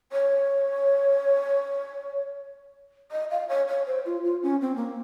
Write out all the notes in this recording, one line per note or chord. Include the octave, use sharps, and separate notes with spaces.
C#5
D#5
F5
C#5
C#5
C5
F4
F4
C#4
C4
A#3